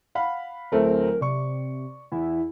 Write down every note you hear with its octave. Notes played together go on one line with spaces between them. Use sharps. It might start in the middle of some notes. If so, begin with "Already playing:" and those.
F5 F#5 B5
D1 A3 C4 A#4
C3 D5 C#6
E2 E4